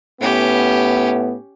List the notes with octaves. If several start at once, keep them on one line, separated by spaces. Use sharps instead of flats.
A2 B3 C#4 G4